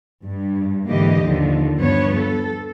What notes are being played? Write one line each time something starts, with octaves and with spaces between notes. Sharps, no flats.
G2
G#2 D3 E3 A#3 G4 D#5
D#2 D3 D#3 F3
G2 F3 B3 C#5
A4